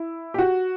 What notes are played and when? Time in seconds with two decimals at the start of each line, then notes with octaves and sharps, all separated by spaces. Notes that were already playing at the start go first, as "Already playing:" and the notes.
Already playing: E4
0.34 G4
0.38 F#4